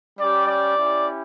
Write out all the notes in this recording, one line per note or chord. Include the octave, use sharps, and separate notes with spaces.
G3 C#4 G4 D5
D5
C#4 E4 G4